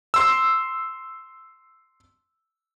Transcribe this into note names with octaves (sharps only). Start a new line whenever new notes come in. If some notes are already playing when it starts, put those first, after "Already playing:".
C6 E6